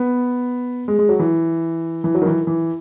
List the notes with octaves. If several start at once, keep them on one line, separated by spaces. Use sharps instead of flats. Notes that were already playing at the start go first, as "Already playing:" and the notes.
Already playing: B3
G#3
G#3
F#3
E3
E3
F#3
D#3
E3
E3